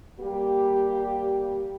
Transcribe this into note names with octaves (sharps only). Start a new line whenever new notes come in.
G3 A#3 G4